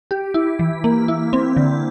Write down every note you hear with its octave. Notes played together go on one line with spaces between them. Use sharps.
G4
E4
E3
A#3
E4
C4
D3